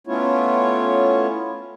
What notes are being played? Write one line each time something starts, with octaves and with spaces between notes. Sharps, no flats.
A3 B3 C#4 E4 F4 C#5